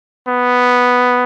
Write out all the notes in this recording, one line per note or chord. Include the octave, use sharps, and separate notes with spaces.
B3